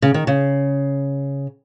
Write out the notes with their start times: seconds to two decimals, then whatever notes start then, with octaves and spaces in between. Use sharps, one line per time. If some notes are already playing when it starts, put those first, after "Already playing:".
0.02 C#3
0.14 D#3
0.27 C#3